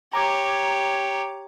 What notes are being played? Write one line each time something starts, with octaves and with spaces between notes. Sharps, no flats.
G4 C#5 A#5 D6 G#6